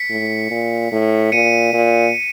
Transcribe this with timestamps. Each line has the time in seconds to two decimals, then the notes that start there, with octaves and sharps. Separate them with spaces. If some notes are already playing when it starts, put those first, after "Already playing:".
Already playing: B6 C#7
0.10 A2
0.50 A#2
0.92 A2
1.32 A#2 C#7 D#7
1.73 A#2